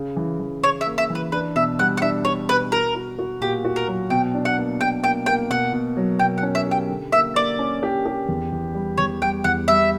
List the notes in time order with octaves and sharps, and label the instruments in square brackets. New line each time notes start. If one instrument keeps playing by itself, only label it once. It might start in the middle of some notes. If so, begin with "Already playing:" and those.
Already playing: [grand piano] C#3
E3
E3
[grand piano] C#3 [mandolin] C#5
[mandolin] E5
[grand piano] A#3
[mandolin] E5
[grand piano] E3
[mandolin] B4
[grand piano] D4 [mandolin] B4
[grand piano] B2 [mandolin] E5
[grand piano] G3 [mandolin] F#5
[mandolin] F#5
[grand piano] D4 [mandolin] E5
[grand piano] D4 [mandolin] C#5
[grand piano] B2 [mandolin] B4
[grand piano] F#4 [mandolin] A#4
[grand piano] F#4
F#4
[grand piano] A#2 [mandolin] G4
[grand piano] F#4
[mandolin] A#4
[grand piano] F#3
[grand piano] B2 [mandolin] G5
[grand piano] D4
[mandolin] F#5
[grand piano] A#3
[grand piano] B2 [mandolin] G5
[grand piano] A#3 [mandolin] G5
[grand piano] A#3 [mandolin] G5
[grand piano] B2 [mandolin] F#5
[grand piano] B2
F#3
[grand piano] B2 [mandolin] G5
[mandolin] F#5
[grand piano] C#4
[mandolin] E5
[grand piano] G4 [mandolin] G5
[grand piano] D3
[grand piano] A#3 [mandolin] E5
[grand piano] A#3 [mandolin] D5
[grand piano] C#4
G4
G4
E2
E2
G3
[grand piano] E2 [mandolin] C#5
[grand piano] G3 [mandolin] G5
[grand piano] E2 [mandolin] F#5
[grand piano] G3 [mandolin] E5